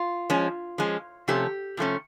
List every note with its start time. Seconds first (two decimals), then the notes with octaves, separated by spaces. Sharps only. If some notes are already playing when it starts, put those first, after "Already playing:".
Already playing: F4
0.30 F3 G#3 C#4
0.78 F3 G#3 C#4
1.28 C3 F3 A3 C#4 G4
1.77 C3 F3 A3 C#4